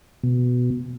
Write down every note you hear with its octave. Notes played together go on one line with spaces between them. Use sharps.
B2